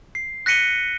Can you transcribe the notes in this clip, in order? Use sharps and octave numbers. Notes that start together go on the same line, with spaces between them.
C7
F#6 A#6 B6 C#7 D#7 G7